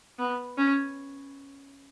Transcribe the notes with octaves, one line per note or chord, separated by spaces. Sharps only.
B3
C#4